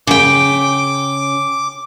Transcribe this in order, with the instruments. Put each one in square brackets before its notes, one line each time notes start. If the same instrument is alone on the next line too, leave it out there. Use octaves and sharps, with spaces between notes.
[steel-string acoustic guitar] C#3 G5 [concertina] D6